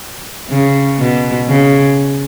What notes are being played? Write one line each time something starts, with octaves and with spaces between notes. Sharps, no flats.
C#3
B2
C#3